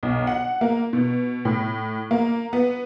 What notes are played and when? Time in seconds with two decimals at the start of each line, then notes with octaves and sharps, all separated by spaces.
0.03 B1
0.27 F#5
0.61 A#3
0.93 B2
1.45 A2
2.11 A#3
2.53 B3